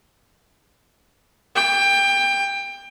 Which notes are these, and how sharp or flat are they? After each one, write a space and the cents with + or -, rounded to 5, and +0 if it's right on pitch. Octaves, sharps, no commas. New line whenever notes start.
G5 +20